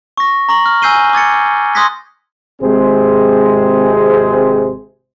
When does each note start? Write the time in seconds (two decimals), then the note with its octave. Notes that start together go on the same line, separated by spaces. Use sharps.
0.17 C#6 A#6
0.49 A#5 C#6 A#6 F#7
0.66 F6
0.82 G#5 E6 G6 C7 D#7 G7
1.13 D6 G#6 A6 C#7
1.75 C6 D#6 F#6 G#6 A#6 B6
2.62 G#1 C3 G#3 C4 G#4 C5